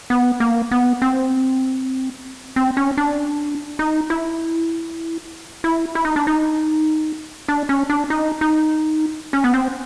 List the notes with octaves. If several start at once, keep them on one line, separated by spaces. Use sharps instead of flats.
B3
A#3
B3
C4
C4
C#4
D4
D#4
E4
E4
E4
D#4
D4
D#4
D4
C#4
D4
D#4
D#4
C#4
B3
C4